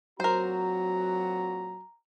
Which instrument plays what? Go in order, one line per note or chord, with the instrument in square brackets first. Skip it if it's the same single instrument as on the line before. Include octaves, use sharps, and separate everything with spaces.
[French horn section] A#2 C4 F#4 [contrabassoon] F#3 [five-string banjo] A#4 C5 [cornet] A#5